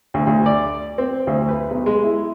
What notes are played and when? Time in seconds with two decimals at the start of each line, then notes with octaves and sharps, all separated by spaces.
0.14 D2
0.27 D2
0.46 D5
0.98 C4
1.27 D2
1.49 B4
1.70 B1
1.86 G#3
2.04 E4